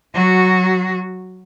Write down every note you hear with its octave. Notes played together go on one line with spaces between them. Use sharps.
F#3 F#4